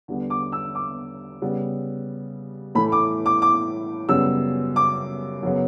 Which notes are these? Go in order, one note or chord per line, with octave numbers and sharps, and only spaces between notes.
E2 D3 G3 B3
D6
E6
D6
C#3 G3 B3
A2 E3 A3 B5
D6
D6
D6
F#2 C#3 G3 B3 E6
D6
F#2 C#3 F#3 B3